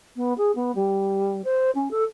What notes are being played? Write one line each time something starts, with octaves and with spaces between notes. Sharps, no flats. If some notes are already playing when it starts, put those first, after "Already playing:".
B3
G#4
B3
G3
C5
C#4
A4